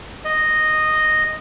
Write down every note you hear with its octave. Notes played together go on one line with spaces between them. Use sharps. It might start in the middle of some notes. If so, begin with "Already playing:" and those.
D#5